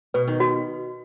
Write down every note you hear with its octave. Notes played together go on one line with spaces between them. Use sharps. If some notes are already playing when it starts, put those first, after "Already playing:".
B2 B4
D#3
F#4